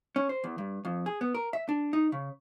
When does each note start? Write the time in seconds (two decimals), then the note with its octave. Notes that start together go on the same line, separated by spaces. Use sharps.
0.16 C#4
0.29 C5
0.44 E2
0.58 G2
0.85 F2
1.06 G#4
1.21 B3
1.35 A#4
1.53 E5
1.69 D4
1.93 D#4
2.12 C#3